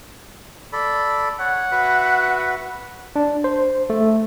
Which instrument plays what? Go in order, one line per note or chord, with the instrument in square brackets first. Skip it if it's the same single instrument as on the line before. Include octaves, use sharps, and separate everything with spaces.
[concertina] A4 D5 B5
[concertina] C#5 [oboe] F#5
[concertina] F#4 B4 E5
[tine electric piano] D4
C5
A3